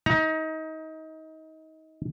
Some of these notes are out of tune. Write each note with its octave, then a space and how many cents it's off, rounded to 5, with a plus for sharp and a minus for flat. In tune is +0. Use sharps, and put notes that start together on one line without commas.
D#4 +25 A#5 +20